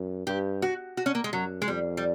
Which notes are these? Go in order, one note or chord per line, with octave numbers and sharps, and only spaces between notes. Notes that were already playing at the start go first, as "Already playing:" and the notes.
Already playing: F#2
G2 G4
F#4
F#4
C#4
A#3
G#3
F#2 F#3
G#3
F2 G3
G3